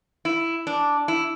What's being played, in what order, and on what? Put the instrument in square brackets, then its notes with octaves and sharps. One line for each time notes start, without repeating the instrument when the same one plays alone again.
[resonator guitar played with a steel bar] E4
D4
E4